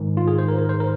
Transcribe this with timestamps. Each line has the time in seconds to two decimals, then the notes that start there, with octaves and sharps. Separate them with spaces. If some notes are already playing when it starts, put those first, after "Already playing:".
Already playing: G#2 D#3
0.17 F4
0.27 G#4
0.38 C5
0.48 A#4
0.58 A#4
0.69 C5
0.80 A#4